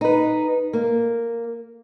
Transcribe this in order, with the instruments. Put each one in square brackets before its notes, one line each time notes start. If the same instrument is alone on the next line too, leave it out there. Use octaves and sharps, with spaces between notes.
[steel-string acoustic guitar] D#4 B4
A#3